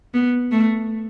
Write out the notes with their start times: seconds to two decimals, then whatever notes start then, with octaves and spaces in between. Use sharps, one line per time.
0.14 B3
0.52 A3